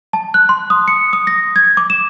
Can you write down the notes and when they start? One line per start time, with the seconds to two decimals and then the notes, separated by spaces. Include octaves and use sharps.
0.13 A5
0.34 F#6
0.49 C6
0.70 D#6
0.88 C#7
1.13 D#6
1.27 A#6
1.56 G#6
1.77 D6
1.90 E7